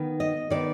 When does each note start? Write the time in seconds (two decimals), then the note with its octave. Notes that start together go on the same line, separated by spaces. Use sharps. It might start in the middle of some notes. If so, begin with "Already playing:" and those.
Already playing: D#3 B3
0.20 D#5
0.50 D#3 B3 D5